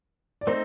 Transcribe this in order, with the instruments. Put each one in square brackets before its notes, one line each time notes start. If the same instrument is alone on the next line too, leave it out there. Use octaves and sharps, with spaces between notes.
[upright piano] D5
[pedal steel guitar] A3 C4 D#4 [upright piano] C5